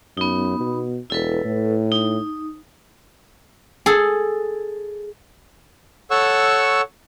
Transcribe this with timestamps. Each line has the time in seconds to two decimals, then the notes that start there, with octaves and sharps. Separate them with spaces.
0.17 F#2 B3 D#4
0.60 B2
1.10 E1 E4 A4 B4
1.45 A2
1.92 D#4
3.86 G#4 A4
6.11 A4 C#5 F#5 C#6 E6